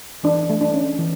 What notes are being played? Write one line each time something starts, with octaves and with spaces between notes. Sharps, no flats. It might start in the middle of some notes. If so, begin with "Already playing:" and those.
E3 D4
A3
D4
C#4
E3